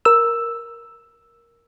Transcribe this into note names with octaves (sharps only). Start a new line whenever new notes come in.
A#4 E6